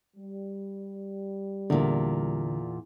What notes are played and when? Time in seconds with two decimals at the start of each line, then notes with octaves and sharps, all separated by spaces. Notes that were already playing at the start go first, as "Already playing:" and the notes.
0.16 G3
1.70 E2 A#2 D3